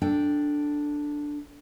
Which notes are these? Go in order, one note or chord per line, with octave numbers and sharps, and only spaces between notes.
D4 A4 G5